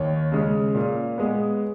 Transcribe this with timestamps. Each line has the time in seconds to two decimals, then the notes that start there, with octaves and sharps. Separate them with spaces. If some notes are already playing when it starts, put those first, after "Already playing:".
Already playing: D#2 C#5
0.32 C#3 G#3 C#4
0.75 A#2
1.18 G#3 B3